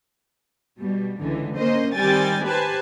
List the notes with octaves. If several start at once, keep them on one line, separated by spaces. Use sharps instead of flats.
B2 G3
C#2 D3 E3
A#3 C#4 C5 D#5
D#3 G3 C4 G5 G#5 A6
G4 B4 C5 G#5 A5